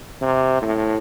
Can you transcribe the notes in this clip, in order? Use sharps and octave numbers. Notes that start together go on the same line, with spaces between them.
C3
A2